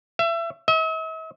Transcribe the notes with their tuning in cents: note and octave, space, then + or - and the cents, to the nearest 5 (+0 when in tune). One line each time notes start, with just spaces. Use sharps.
E5 +30
E5 -45